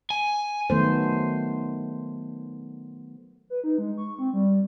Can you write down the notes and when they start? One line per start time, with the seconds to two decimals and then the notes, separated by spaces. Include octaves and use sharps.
0.10 G#5
0.70 D#3 F#3 A3 B3 C5
3.50 B4
3.64 D#4
3.78 G#3
3.98 C#6
4.19 C4
4.33 G3